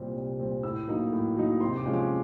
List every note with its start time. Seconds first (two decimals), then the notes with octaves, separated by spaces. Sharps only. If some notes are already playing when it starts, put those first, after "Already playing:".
Already playing: C2 A#2 G3 C4
0.15 C2
0.39 A#2 G3 C4
0.63 A2 E6
0.87 F#3 A#3 D#4
1.12 A2
1.36 F#3 A#3 D#4
1.60 C3 C6
1.77 D6
1.85 F3 G#3 C#4 F4
1.94 D6